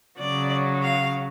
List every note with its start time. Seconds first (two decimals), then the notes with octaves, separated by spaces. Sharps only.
0.19 C#3 F#3 D5
0.82 F5